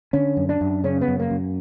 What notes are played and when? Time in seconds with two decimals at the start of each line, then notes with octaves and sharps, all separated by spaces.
0.13 D3 C#4
0.37 F#2
0.49 D4
0.61 F#2
0.84 C#3 C#4
1.01 B3
1.08 F#2
1.20 A#3
1.30 F#2